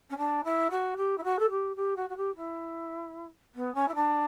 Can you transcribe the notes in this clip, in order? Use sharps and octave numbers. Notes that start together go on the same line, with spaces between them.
C#4
D4
E4
F#4
G4
E4
F#4
A4
G4
G4
F#4
F#4
G4
E4
B3
C#4
E4
D4